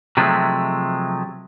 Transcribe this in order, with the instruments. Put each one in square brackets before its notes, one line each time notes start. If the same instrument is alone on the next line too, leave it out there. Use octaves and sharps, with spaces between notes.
[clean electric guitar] C3 F3 F#3 G#3 A3